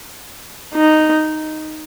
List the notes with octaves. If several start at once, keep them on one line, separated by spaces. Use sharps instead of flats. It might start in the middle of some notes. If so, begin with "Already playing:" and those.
D#4